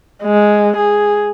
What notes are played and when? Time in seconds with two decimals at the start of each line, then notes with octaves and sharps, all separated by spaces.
0.23 G#3
0.77 G#4